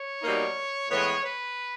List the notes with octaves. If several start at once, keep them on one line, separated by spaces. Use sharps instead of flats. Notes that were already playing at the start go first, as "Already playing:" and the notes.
Already playing: C#5
B2 G3 A#3 D#4
A2 E3 G#3 B3 C#5
B4